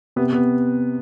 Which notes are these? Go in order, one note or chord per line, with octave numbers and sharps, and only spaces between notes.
C3 B3
B3